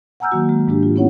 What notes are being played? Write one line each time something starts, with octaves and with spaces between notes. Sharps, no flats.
F#5 G#5 A#5 E6 F6 G6
D#3 F#3 A#3 F#4
G#3
G#2 G#3 D4 G4
F4
B3 C#4 E4 C#5 F#5